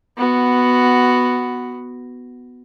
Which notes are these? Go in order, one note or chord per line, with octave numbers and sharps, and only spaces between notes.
B3 F#4